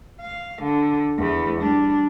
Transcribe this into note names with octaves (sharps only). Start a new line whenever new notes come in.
F5
D3
E2 E3
G3 D4